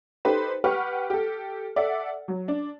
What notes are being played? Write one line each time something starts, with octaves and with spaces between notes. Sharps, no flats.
D#4 G4 A4 B4 C5
G4 B4 F#5 C#6 F6
G4 A4
A4 D5 E5 F#5
F#3
D4